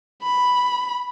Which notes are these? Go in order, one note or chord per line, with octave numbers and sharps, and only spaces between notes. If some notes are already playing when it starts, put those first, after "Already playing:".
B5